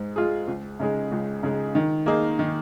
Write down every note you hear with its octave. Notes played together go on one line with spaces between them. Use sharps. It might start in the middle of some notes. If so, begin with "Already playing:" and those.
Already playing: G#2 G#3
G#3 F4 G#4
C#2
C#3 G#3 D#4 G#4
C#2
C#3 G#3 D#4 G#4
D#3
A#3 D#4 G#4
D#3